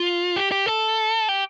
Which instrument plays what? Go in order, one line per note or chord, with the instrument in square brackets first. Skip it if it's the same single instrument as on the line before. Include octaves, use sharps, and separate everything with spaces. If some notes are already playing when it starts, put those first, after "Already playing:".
Already playing: [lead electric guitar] F4
G4
G4
A4
G4